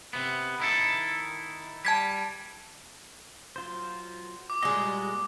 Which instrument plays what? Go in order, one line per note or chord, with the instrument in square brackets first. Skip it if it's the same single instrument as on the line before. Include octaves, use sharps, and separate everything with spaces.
[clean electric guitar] C3 B3
D#3 E4 A4
[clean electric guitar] G3 [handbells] A5 G#6 B6
[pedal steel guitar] F#3 F4 C5
[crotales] D6
[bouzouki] A#2 G#3 [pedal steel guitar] G3 F#4 D#5